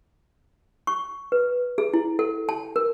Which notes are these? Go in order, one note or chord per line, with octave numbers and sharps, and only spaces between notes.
C#6
B4
G#4
E4
A4
A5
A#4